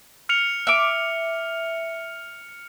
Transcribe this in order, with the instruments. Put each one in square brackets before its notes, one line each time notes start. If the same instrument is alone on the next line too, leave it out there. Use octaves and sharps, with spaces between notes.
[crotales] F6 C#7 F7
[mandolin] E5 D6